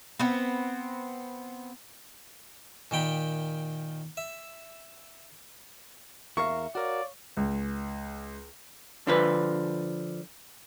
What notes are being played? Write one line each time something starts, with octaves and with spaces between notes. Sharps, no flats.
B3 C4
A#2 D#3 G5 B5
E5
E2 A#4 E5 F5 C#6
F#4 A#4 C#5 D5 F5
C#2
D3 F3 B4